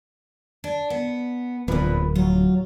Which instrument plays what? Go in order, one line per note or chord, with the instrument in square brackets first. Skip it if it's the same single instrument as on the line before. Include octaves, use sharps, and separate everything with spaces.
[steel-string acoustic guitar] D4
B3
[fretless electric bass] D1 [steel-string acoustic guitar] A#2 F3 [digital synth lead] B4
[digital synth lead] F#3 [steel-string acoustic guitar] F4